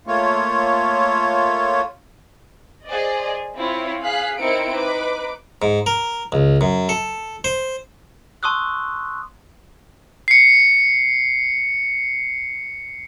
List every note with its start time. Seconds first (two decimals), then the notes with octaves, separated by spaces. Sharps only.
0.07 A3 A#3 F4 C#5
2.87 G#4 C5 D5 D#5
3.55 C4 E4 F4 C#5
4.01 G#4 F5 F#6 B6 C7
4.40 C4 D#4 E4 A#4 C#7 D7
4.72 D#4 B4 D6
5.62 G#2
5.86 A#4
6.32 C#2
6.61 F#2
6.89 A4
7.44 C5
8.43 A5 C6 C#6 D#6 E6 F#6
10.28 C7 C#7